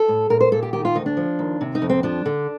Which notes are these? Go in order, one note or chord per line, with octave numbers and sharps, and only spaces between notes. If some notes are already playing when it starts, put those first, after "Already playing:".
Already playing: A4
A2
A#2 A#4
C5
A#2 A4
G4
D#3 G4
F4
D2 D#4
D4
F3
D#2
C3
D#4
F2
C4
F3 D4
D3